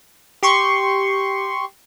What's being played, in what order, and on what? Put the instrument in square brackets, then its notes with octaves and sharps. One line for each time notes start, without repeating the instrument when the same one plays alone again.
[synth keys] G4 C6 C#6